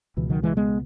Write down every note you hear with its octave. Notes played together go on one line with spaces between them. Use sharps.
C#2 B2 E3
D#3 F#3
E3 G#3
G#3 B3